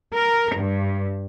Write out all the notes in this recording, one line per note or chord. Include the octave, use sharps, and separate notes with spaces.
A#4
G2